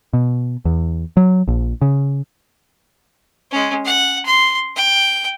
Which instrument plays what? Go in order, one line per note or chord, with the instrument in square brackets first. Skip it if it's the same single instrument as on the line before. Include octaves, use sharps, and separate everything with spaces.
[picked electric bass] B2
E2
F#3
A#1
C#3
[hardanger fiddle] G#3 C#4
F#5
C6
G5